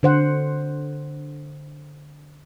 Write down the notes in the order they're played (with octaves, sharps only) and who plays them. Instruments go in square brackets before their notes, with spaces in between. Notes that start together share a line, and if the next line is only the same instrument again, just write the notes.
[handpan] D3 C5 F#5